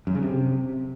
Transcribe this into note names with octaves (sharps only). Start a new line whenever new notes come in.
F#2
C#3
C3